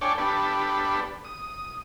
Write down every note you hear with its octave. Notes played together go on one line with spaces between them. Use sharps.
D4 A4 C#5 D5 G5 G#5
B3 D4 G4 A4 B4
D#6